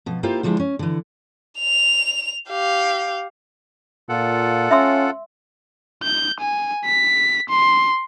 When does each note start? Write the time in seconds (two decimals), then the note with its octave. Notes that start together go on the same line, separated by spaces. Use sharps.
0.06 B2 F3
0.23 A#3 E4 F4 G4 C5
0.43 D3 F3 G3 G#3 E4
0.59 C#4
0.79 D3 E3
1.59 F7
2.49 G4 F5
4.09 A#2 F4 A4 F#5
4.71 C#4 E5 C6 E6
6.03 G6
6.40 G#5
6.85 B6
7.50 C6